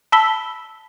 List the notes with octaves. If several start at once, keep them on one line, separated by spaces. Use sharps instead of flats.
A5 B5 E6 B6 G7